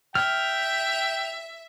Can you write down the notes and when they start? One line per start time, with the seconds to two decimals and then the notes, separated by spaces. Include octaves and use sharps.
0.15 E5 G5 F6